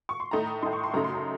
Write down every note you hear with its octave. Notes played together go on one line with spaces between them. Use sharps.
C#6
C6
A2 A3 D#4 A#5
A2 A3 D#4 C6
C#6
C6
F#2 C#3 A3 D#4 A#5
C6
A#5